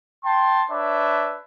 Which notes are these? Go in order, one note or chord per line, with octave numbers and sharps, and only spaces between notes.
G5 A5 C6
D4 B4 C#5 E5